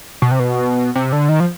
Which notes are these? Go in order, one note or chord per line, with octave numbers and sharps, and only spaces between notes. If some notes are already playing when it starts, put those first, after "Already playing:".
B2
C3
B2
C3
D3
D#3
F3